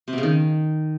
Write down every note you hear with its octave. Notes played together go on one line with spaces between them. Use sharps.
C3
B2
C#3
D#3